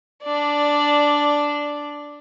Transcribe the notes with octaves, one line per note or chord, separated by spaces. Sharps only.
D4 D5